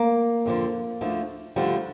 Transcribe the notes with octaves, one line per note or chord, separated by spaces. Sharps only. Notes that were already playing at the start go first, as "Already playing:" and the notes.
Already playing: A#3
F2 D3 F3
D2 D3 F3
D2 D3 F3 G3